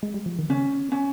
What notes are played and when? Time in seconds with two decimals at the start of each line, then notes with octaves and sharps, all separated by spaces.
0.03 G#3
0.14 G3
0.26 F3
0.39 D#3
0.49 C#3 C#4
0.92 C#4